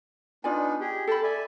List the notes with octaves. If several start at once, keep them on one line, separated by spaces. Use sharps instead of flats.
B3 D4 D#4 F4 D5 G#5
G4 G#4
A4 G5 A5 B5
D5 E5 G#5